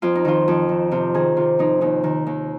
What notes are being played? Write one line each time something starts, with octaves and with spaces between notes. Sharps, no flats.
F2 F4
D#4
D#3 F4
F2
D#3
C3 F4
D#3 G#4
C3 F4
F2 D#4
D#2 D#4
D#3
D#2